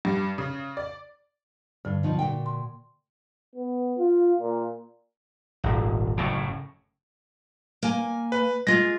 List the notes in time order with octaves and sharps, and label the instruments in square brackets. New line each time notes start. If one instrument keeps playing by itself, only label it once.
[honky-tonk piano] G2
C#3
D5
[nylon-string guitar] G2 [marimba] D3
[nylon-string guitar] B2 F3 D#4
A#2 F#4 G5
[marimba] C6
[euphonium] B3
F4
A#2
[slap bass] D#1 G#1
F#1 A2 C#3
[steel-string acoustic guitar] A#3 G#5
[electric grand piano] B4
[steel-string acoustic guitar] G#3 F4 G#4 [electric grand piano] A#6